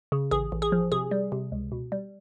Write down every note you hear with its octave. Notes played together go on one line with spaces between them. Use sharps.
C#3
A1 G#4
A1
G#4
F3
C3 G#4
G3
C3
C#2
B2
G3